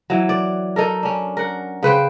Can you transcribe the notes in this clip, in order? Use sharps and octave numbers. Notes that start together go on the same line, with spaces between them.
E3 F#3
D5
D#4 A4 A#4
C#4 D4
A#4 F#5
C#3 B4 C5 G5